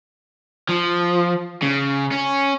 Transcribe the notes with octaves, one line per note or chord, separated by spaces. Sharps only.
F3
C#3
C#4